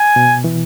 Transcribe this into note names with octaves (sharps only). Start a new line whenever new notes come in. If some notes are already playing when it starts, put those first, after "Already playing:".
Already playing: G#5
B2
E3